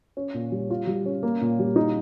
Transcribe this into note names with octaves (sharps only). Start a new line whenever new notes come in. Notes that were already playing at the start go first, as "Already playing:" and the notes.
C#4
A#2
G3
F4
G3
C#4
A#3
A#2
G3
D#4